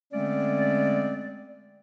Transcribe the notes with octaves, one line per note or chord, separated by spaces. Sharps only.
D3 G#3 A3 C4 C#4 D5